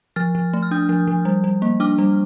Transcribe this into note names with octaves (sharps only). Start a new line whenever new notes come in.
F3 F6 A6
F3
A3
F6
D4 D#6 G6
F3
F3
G3
G3
A#3
D4 D6 F6
G3